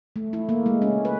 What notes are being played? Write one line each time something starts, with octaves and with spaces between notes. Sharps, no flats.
A3
E4
A#3
G#3
C#4
B4